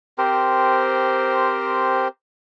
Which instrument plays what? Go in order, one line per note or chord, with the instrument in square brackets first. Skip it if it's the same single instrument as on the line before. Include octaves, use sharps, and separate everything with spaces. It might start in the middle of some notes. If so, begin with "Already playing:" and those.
[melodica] C4 G4 A#4 C5